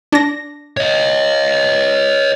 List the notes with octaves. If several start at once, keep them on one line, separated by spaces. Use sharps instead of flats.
D4 A#6
C#5 D#5